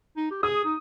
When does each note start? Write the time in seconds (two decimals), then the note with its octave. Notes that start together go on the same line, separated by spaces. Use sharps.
0.17 D#4
0.31 G4
0.43 G#4 D#6
0.65 D#4